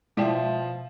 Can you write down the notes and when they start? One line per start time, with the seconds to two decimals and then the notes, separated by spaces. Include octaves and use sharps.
0.17 B2 F3 G#3 E4 C5 D5 E5 G5